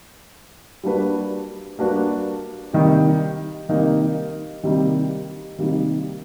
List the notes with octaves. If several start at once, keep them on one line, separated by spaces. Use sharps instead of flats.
G3 A#3 D4 F#4 B4
G3 A#3 D4 F#4 B4
C3 D#3 G3 A#3 D#4
C3 D#3 G3 A#3 D#4
C3 D#3 G3 A#3 D#4
C3 D#3 G3 A#3 D#4